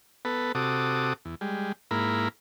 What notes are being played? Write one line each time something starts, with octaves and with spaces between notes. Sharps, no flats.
B3 A4 B4
C3 F#4 A4 D6 D#6
E2
G3 G#3
G#2 A#3 E4 A#4 B5